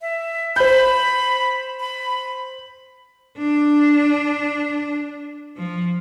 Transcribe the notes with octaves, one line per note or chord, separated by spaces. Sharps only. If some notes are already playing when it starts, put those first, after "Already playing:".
E5
C5 B5 G6
B5
D4
F3